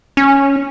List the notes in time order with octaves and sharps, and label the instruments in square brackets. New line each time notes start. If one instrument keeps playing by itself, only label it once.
[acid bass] C#4